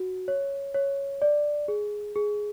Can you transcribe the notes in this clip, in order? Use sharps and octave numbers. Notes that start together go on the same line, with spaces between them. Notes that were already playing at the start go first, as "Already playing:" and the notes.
Already playing: F#4
C#5
C#5
D5
G#4
G#4